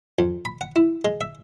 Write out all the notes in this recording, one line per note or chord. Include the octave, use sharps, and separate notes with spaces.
F2
B5
F#5
E4
G#3
E5